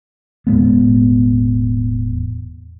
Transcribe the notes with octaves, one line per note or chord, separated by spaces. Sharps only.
E1 A2 G#3 B3